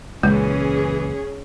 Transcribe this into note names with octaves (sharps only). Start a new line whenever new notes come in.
C#2 A#2 C#3 E3 G#3 C#4 G#4